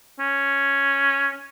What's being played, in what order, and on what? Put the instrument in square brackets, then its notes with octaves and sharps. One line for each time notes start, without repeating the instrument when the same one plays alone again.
[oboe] C#4